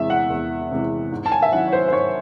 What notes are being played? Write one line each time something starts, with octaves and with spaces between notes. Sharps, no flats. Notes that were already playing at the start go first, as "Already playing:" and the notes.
Already playing: E2 C3 E3 G#3 E5
F#5
E2
C3 E3 G#3
G#2
A5
G#5
E5
D#3 F#3 C#4 E4 F#5
C#5
C5
C5
G#2 C#5